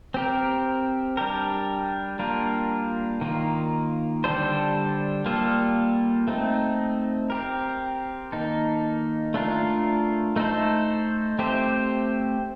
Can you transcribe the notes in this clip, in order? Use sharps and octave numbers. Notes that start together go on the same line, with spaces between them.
C4 G4 A#4
G3 D4 G4 A#4
G3 A#3 D4 F4 A#4
D#3 A#3 F4
D3 G3 D4 A4 C5
G3 A#3 F4 A4
A3 C4 D#4
C4 G4 A#4
D#3 A#3 D#4 A4
A3 D4 F4 A#4
A3 D#4 A4 C5
A3 C4 G4 C5